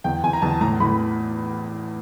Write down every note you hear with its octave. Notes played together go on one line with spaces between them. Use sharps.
E2 G5
E2 G#5
A#5
E2 A5
A2 A#5
A2 B5